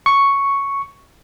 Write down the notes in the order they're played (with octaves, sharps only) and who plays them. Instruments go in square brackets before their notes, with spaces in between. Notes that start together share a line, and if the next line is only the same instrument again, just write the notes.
[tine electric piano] C#6